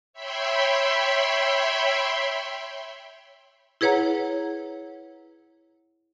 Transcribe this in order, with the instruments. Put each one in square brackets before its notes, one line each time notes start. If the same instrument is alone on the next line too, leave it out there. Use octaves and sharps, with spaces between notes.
[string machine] C#5 E5 G5 B5 C6
[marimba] E4 G#4 B4 C#5 F#5 A#5